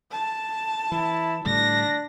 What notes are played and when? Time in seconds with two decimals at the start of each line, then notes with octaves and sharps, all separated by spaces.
0.12 A5
0.92 E3 E4
1.46 A2 D3 G3 D4 A#6